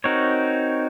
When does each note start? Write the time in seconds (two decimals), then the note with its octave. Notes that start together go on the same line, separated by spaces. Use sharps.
0.04 C4 D#4 F#4 A#4 C#5